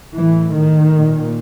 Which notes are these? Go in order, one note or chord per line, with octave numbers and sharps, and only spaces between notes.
A2 E3
D#3
A#2